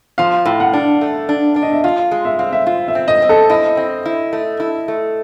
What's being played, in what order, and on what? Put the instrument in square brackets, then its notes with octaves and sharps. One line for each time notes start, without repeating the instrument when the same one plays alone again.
[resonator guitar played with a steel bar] F3 [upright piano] F5
[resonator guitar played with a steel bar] A2
[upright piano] F#5
[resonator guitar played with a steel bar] D4
A3
D4
D4
[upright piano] D#5
E5
[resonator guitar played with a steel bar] F4 [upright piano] F5
[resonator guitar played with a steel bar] G#3
[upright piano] E5
[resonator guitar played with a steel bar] C4 [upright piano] F5
[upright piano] E5
[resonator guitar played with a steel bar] F4
[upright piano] E5
[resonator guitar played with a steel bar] C4
[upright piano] D#5
[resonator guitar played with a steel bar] C4
[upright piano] A4
[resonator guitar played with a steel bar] E4 [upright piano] D#5
[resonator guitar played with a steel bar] C4
E4
A3
E4
A3